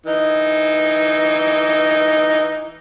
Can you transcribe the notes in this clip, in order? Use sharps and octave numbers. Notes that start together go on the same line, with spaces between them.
E3 D#4